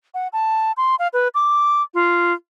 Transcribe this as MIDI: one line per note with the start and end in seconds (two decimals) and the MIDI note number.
0.14 0.28 78
0.33 0.72 81
0.77 0.95 84
0.99 1.08 77
1.13 1.28 71
1.35 1.82 86
1.94 2.33 65